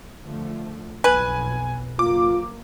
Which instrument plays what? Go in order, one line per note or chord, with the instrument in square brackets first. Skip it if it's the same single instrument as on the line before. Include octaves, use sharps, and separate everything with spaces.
[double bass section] D3 F3 A3
[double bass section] B1 F2 B2 [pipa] B4 [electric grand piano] G#5
[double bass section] F#1 A#3 [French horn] F4 [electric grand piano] D6